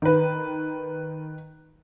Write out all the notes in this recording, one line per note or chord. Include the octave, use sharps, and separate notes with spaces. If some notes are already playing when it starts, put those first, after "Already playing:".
D#3 B4